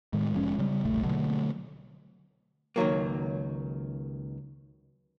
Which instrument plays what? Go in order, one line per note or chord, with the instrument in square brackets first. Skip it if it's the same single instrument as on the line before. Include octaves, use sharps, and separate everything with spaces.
[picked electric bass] A2 D#3 G#3
F1 F3 G#3 C#4
C#3 G3
E1 A#1 A3
B2 D3 F#3 A3
[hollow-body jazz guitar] C#2 D#3 F#3 A#3